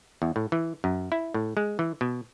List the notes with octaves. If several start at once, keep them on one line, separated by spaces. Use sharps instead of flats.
E2
A2
E3
F#2
E4
A2
G#3
E3
B2